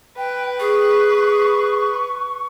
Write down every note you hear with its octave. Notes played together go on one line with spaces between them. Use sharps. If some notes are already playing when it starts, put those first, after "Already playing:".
B4 G5
G#4 C#6